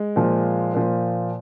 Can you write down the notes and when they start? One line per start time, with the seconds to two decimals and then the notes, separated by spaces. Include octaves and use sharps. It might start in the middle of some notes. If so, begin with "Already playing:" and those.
Already playing: G#3
0.16 A#2 F3
0.74 A#2 F3